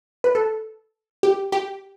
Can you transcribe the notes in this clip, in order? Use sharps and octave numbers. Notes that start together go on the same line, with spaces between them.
B4
A4
G4
G4